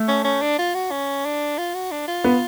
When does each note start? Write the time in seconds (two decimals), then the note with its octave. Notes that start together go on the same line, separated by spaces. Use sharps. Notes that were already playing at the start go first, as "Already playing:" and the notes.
Already playing: A3
0.08 C#4
0.24 C#4
0.42 D4
0.59 F4
0.75 F#4
0.91 C#4
1.25 D4
1.58 F4
1.74 F#4
1.91 D4
2.08 F4
2.24 B3